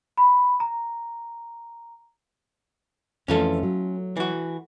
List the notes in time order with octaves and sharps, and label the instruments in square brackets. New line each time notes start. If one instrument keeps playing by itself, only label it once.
[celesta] B5
A#5
[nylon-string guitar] F2 E3 A3 [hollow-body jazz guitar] C#4 F4 A4
[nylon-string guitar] F#3
[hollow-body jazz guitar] E3 F#4